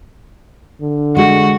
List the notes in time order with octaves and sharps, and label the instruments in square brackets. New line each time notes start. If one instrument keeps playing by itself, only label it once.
[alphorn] D3
[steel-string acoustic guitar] G#3 [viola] F#4